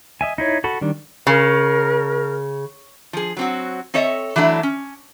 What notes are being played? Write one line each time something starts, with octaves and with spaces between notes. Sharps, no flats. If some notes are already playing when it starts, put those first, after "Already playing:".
D#5 E5 G#5
D#4 E4 C#5
F#4 A4 B5
D#3 G3 D4
C#3 A#4
F3 G#4
F#3 C4 F#4
C4 A4 C#5 D#5 E5
E3 F#3 A3 D4 E4
C#4